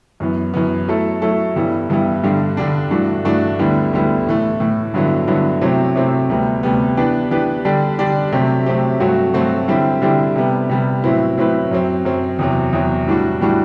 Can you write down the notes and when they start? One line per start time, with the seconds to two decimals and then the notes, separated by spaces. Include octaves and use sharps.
0.20 F#2 E3 B3
0.54 F#2 E3 B3
0.88 F#3 A3 E4 A4
1.22 F#3 A3 E4 A4
1.55 G2 E3 G3 B3 E4
1.90 G2 E3 G3 B3 E4
2.23 G2 D3 G3 D4
2.57 G2 D3 G3 D4
2.91 G2 E3 A3 D4 F#4
3.25 G2 E3 A3 D4 F#4
3.59 D2 D3 G3 B3 E4
3.93 D2 D3 G3 B3 E4
4.26 A2 E3 A3
4.60 A2 E3 A3
4.94 G2 D3 F#3 B3 E4
5.28 G2 D3 F#3 B3 E4
5.61 C3 F#3 A3 C4 E4
5.96 C3 F#3 A3 C4 E4
6.29 D2 C3 G3 B3
6.63 D2 C3 G3 B3
6.97 E3 B3 D4 G4 B4
7.31 E3 B3 D4 G4 B4
7.65 D3 G3 D4 G4 D5
7.99 D3 G3 D4 G4 D5
8.32 C3 F#3 A3 C4 G4
8.66 C3 F#3 A3 C4 G4
9.00 G2 F#3 A3 C4 F#4
9.34 G2 F#3 A3 C4 F#4
9.68 D3 G3 C4 E4 G4
10.02 D3 G3 C4 E4 G4
10.36 C3 G3 B3
10.69 C3 G3 B3
11.03 A2 F#3 C4 E4 B4
11.37 A2 F#3 C4 E4 B4
11.71 F#2 F#3 C4
12.05 F#2 F#3 C4
12.39 E2 C3 F#3
12.73 E2 C3 F#3
13.06 A2 E3 G3 D4 F#4
13.40 A2 E3 G3 D4 F#4